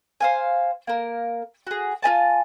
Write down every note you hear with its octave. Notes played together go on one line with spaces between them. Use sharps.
C5 F5 G#5
A#3 A#4
F#4 G#4
F4 D#5 G#5 A5